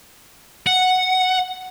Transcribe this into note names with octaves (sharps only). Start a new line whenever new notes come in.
F#5